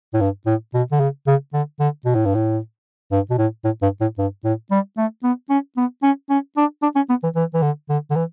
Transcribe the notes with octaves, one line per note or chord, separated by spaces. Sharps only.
A2
G2
A2
B2
D3
C#3
C#3
D3
D3
B2
A2
G2
A2
G2
B2
A2
A2
G2
A2
G2
A2
G3
A3
B3
C#4
B3
C#4
C#4
D4
D4
C#4
B3
E3
E3
E3
D3
D3
D3
E3